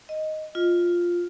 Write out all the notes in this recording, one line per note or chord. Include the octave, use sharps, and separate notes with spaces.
D#5
F4